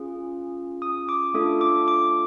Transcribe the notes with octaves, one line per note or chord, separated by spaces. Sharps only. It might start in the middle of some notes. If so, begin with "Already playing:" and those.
Already playing: C#4 F4 G#4
D#6
D6
A3 D4 F4 A4 D#6
D6
D6